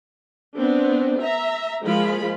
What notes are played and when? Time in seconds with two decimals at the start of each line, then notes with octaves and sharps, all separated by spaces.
0.57 B3 C4 D4
1.22 E5 A#5
1.83 F3 G#3 A#3 F4 G#4 B5